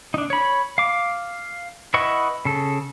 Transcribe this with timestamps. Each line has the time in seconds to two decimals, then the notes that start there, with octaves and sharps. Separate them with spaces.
0.14 D4 D#4
0.30 C#5 B5
0.78 F5 D6
1.94 E4 B4 D#5 F#5 C#6
2.45 C#3 A4